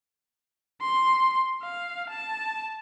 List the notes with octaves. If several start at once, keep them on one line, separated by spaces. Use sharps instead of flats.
C6
F5
A5